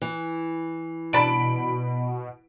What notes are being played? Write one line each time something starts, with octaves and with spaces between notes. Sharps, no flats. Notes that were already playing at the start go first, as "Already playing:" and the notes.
E3
B2 D4 A5 B5 D7